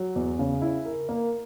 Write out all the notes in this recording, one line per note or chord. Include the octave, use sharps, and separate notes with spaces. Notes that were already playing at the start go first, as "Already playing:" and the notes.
Already playing: F#3
E2
C#3
E4
A#4
A#3